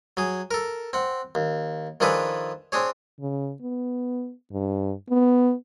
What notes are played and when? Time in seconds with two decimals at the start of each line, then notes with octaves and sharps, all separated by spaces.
0.17 F#3 G#4
0.51 A4 A#4
0.93 C4 F#5
1.35 D#2
2.00 D#3 F3 D4 G#4 A4 B4
2.72 C4 D4 G#4 C#5
3.20 C#3
3.62 B3
4.51 G2
5.10 B3